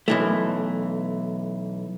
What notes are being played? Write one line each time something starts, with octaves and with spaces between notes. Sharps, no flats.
B1 E3 A3